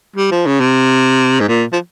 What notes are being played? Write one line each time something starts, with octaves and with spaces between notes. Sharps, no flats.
G3
F3
C#3
C3
G#2
A#2
F3